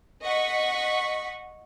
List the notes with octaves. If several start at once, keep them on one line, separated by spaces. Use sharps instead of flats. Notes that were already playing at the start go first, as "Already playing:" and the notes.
D#5 F#5 C#6 B6